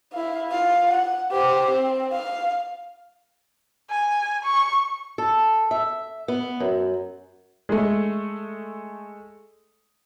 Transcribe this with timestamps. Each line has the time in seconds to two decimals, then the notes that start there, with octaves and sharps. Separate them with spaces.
0.13 E4 F5
0.50 F4 F5
0.91 F#5
1.31 G4 C5
1.71 C4
2.12 F5
3.90 G#5
4.44 C#6
5.18 A4
5.71 E5
6.28 B3
6.60 F#2
7.69 G#3 A3